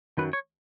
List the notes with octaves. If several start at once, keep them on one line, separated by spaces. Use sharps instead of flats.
F#2 D#3 F#3 B4
C#5